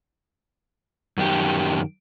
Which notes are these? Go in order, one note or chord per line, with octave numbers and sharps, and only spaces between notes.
F#2 D#3 G4